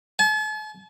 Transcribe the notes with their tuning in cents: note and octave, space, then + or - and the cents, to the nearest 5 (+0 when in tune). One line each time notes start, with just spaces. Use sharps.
A5 -45